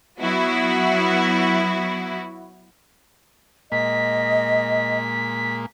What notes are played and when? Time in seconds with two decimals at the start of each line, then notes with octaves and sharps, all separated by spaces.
0.21 F#3 B3 E4 F#4
3.72 A#2 G#3 A#3 D#5 B6